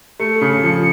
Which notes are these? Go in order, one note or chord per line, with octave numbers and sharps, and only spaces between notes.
A3 C#7
C#3
F3